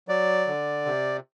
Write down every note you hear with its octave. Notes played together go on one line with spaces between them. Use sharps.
F#3 D5
D3
C3